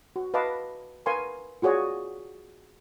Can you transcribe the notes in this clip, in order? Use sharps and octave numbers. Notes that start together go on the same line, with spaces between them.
F#4
B4 D#5 F5 A5 D6
A#4 B4 F5 G#5 C6 C#6
F4 F#4 G#4 C#5 D5